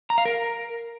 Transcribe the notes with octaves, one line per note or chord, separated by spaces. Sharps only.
A#5
F5
A#4